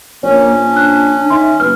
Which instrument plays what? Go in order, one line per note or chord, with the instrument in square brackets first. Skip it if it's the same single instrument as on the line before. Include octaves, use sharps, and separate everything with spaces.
[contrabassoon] A#1 [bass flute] A#3 [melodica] C#4 [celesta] C#5
[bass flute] D4
[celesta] F#6
[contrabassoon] D#3 [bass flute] E5 [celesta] C6
[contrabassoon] F#1 [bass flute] B4 [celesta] F6